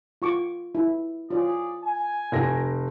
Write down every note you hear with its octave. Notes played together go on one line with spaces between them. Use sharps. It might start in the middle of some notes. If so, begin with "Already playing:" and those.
F4 C#6 D6
E4
F4 G#4 C#5 D5
G#5
F1 A#6 D7